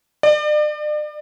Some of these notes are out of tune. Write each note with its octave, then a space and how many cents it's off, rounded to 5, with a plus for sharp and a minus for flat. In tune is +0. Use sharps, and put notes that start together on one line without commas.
D5 +40